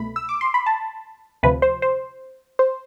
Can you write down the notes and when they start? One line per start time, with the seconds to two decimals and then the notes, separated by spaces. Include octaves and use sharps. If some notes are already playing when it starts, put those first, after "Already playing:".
Already playing: C2 B2 A3 B5
0.16 E6
0.29 D6
0.41 C6
0.54 B5
0.66 A5
1.43 D2 C3 F3 B4
1.62 C5
1.82 C5
2.59 C5